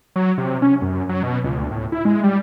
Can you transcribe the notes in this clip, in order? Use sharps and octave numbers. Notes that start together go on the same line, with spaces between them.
F#3
C3
C#4
F#2
F#3
B2
C#2
D2
A2
E4
G#3
G3